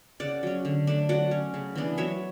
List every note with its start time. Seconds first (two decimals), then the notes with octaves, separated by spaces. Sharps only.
0.20 C#3 D5 F#5
0.43 F#3 C#4
0.65 D3
0.87 A3 D4
1.09 F#3 D5 F#5
1.31 C#4
1.54 C#3
1.75 E3 B3 D4
1.98 F#3 C#5 E5